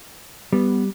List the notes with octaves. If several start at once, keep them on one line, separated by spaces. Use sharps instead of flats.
G3 B3